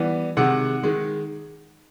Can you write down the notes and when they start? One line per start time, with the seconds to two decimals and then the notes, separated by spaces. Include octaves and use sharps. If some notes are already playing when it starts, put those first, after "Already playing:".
Already playing: E3 G3 B3
0.37 C3 D#3 G#3 F#5
0.83 D#3 G#3